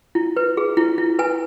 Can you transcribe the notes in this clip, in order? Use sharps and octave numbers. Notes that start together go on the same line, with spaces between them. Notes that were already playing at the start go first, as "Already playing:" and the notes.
E4
B4
G#4
E4
E4
B4 G#5